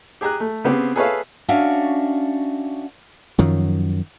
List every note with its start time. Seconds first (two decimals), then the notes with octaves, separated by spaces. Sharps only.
0.21 G4 G#4 G#5 A#5 F#6
0.40 A3
0.64 C#3 B3 C4 G4
0.96 G#4 A4 B4 C#5 E5 F5
1.48 C#4 D4 F#4 E5 F5
3.38 F#2 D#3 F3 F#3